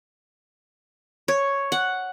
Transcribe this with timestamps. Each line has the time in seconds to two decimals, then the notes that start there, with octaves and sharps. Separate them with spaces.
1.28 C#5
1.72 F#5